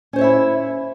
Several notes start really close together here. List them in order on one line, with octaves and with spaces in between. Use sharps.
C#4 C5 C#5 E5 E4